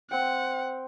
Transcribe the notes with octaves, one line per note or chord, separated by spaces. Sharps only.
C4 F#5 G5